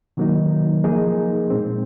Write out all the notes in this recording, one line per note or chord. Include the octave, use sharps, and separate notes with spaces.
C3 D#3 F#3 A#3 D#4
F3 A#3 D#4 G#4
A#2 G#3 C4